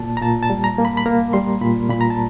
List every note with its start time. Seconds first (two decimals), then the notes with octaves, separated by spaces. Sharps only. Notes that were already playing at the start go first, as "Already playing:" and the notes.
Already playing: A#2 A#3 A5
0.17 A#5
0.22 A#2 A5
0.43 A5
0.50 G3
0.64 A#5
0.78 A#3
0.85 B5
0.97 B5
1.06 A#3 A#5
1.33 G3 C6
1.61 A#2 B5
1.89 A#2 B5
2.01 A#5
2.10 A5